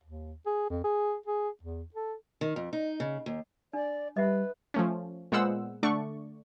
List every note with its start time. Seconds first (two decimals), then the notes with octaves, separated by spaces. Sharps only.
0.04 D#2
0.46 G#4
0.70 F2
0.84 G#4
1.26 G#4
1.63 E2
1.94 A4
2.41 D#3
2.56 F2
2.73 D#4
3.00 C#3
3.26 D#2
3.73 D4 D5
4.17 G3 B4 D#5 E5 F#5
4.74 F3 A3 C#4
5.32 A#2 G#3 B3 C5 F#5 E6
5.83 D3 A3 D4 D5 C#6